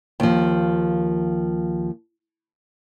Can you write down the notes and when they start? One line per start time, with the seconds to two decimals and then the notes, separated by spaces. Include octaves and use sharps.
0.20 D#2 F3